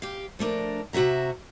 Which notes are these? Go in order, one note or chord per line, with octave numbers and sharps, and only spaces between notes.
G4 F5
F3 A3 D4 A#4
C3 F#4 C5 E5 A#5